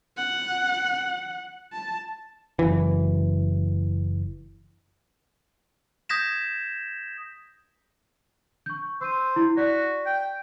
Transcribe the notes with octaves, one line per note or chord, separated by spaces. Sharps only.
F#5
A5
F#1 E3
D#6 G6 G#6 A#6 B6 E7
C#6 G6
C5 E6 D#7
E4
F#4 D5 B6
G5